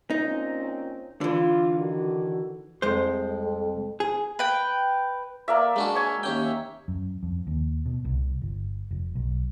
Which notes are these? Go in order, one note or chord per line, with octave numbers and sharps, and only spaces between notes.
A#2 C4 C#4 D#4
D3 E3 F4
D#3 D4 F#4
C2 F2 G#3 C5
G#4
B4 G5
A#3 D5 E5
G#3 D4 F#4
C#5 G#5
D#2 C#4 G5
F#2
F2
D#2
B2
C2
G1
F1
B1